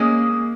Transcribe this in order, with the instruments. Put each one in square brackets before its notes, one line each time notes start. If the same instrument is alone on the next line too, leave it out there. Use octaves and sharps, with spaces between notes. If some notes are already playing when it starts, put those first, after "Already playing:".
Already playing: [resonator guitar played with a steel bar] G#3 C#4 G#4 [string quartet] A#3